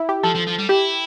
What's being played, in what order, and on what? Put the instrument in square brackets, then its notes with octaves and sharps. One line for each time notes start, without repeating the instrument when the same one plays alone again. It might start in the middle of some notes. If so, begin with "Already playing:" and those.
Already playing: [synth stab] E4
G4
[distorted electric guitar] F3 [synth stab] A4
[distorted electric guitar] F3
F3
G3
[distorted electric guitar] E4 [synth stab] G4